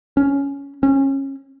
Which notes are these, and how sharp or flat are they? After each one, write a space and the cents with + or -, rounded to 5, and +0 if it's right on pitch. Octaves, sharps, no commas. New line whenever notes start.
C#4 +10
C#4 -25